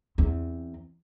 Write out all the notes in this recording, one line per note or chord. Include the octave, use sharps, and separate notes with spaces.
E2 C4